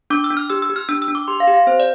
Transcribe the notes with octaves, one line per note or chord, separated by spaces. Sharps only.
D4 D6
E6
D4
F6
G4 E6
E6
G4
F6
D4 E6
E6
D4
D6
G4 C6
F5
G4
F5
C4 C5
D5